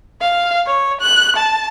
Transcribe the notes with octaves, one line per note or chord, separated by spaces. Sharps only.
F5
C#5
F#6
A5